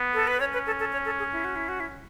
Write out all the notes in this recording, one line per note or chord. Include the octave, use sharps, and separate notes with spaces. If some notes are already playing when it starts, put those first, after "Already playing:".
Already playing: B3
A4
B4
C#4 C#5
B4
A4
A4
C#5
A4
G#4
E4
F#4
E4
F#4
E4